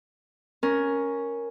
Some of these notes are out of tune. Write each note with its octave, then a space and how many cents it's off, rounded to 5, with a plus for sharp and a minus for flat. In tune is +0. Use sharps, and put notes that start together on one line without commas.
C#4 +0 A#4 +5